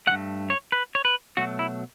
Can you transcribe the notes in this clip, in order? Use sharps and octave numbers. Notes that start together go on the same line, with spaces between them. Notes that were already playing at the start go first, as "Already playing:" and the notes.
G2 E3 A3 F#5
C#5
B4
C#5
B4
B2 F#3 A3 F#4
E4